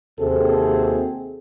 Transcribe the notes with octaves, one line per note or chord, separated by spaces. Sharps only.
D#2 C3 C4 F#4 G#4 A4